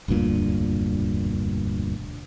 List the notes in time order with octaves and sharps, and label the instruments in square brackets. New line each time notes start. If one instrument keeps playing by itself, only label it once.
[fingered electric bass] E1 D2 G2 A#2